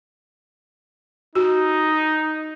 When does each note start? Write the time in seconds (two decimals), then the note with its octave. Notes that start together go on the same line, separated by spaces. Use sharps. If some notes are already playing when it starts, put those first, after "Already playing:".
1.35 D#4 F#4